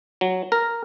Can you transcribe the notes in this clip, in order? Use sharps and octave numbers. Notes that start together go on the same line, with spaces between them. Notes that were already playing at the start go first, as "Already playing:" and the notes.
F#3
A#4